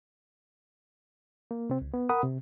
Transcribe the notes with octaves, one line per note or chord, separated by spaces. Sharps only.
A#3
C3 C4
C#2
B3
A#4 F#5 B5 D#6
C3